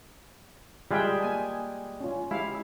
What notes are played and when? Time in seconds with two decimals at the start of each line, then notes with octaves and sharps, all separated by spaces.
0.91 G3 G#3 F4 G#4 E5 G5
1.20 A#3 G#5 A5
2.00 C#4 F4
2.31 G#3 E4 G4 F5